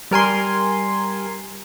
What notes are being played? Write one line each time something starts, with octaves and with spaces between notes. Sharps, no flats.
G3 A#4 G#5 C6